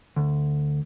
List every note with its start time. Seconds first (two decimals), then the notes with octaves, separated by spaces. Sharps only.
0.16 D2